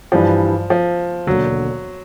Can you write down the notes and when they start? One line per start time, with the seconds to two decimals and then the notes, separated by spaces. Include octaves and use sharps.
0.12 G2 E3 F3 G3
0.70 F3
1.27 E1 D#2 D3 F#3